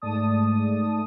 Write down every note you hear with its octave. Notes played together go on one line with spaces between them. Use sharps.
G#2 A3 D5 A5 D#6